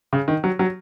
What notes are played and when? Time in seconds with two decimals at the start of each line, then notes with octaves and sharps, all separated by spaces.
0.13 C#3
0.28 D#3
0.44 F#3
0.59 F#3